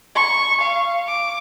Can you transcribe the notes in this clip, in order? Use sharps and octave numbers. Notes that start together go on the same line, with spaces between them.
C#6
F5
D6